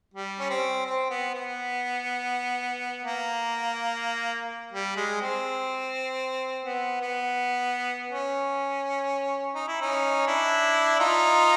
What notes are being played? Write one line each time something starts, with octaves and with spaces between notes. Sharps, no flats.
G3
C#4
C4
C4
B3
B3
A#3
G3
G#3
C4
B3
B3
C#4
D#4
E4
C#4 D#4
D4 E4
D#4 F4